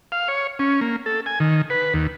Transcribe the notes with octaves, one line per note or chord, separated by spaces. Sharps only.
F5
C#5
C#4
A#3
A4
G#5
D#3
B4
D#2